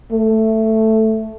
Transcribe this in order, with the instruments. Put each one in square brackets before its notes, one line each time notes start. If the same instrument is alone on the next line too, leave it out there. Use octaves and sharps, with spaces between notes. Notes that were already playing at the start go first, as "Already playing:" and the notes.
[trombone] A3